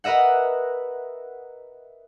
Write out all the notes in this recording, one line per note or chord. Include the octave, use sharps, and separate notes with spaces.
A#4 B4 D#5 E5 F#5